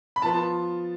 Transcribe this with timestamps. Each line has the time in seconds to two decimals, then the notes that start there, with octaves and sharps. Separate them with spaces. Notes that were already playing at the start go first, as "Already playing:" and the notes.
0.16 B5
0.22 F3 B3 F4 A5